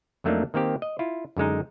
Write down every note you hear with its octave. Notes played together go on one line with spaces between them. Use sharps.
F2 F#3 A3 A#3 D4 D#4
D#3 A#3 C4 G4
D#5
E4 F4
F#2 D3 G#3 D#4